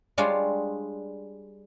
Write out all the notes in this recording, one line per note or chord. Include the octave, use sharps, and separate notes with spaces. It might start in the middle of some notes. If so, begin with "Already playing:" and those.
G3 G#3 D4 F4 C#5